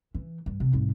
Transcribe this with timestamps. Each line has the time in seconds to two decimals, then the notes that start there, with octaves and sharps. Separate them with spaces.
0.14 E3
0.46 G2
0.60 C3
0.73 C2 G#2